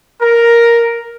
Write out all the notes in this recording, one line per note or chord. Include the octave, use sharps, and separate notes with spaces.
A#4